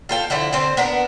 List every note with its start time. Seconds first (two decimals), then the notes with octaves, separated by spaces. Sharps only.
0.09 F4 A4 G5
0.30 D3 F3 E4 F#4
0.53 D3 C4 C5
0.77 B3 D4 A#4